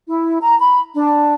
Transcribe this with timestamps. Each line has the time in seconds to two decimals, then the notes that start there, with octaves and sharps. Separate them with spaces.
0.09 E4
0.41 A#5
0.59 B5
0.94 D4